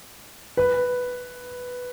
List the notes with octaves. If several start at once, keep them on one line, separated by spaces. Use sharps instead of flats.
B4